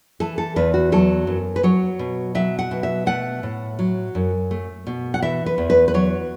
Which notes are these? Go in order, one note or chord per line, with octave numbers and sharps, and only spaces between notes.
E3 A4
A4
E2 B4
F#4
F#3 A4
F#2
B4
F#3 C#5
B2
F#3 E5
F#5
B2
E5
A3 F#5
A2
F#3
F#2
A3
B2
F#5
E3 E5
B4
E2
B4
B4
F#3 C#5